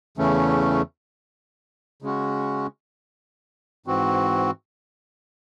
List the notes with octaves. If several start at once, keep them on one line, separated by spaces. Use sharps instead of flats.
E2 C#3 E3 A3 C#4
C#3 G#3 C#4 F#4
G#2 E3 C4 F#4